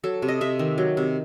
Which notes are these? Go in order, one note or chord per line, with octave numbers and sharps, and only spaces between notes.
F#3 A4
C3
D#5
C3 E5
D#3
F#3
C3